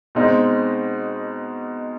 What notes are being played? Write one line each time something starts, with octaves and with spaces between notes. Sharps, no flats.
B2 G#3 C4 D#4